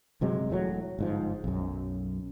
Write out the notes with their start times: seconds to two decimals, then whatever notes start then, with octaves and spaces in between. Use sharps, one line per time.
0.21 G1 C3 F#3 G#3
0.50 E1 A2 F3 F#3
0.99 G1 G#2 F3
1.44 B1 F#2